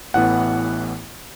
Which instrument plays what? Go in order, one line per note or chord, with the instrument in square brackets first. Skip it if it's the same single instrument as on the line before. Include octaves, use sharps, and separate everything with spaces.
[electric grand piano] A1 A2 E3 B3 F#5